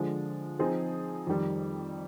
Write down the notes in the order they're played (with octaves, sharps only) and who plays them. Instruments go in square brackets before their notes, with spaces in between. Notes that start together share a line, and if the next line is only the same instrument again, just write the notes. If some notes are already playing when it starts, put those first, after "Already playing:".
Already playing: [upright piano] D3 F3 G#3
F3 C4 D#4 G#4
F2 D#3 G3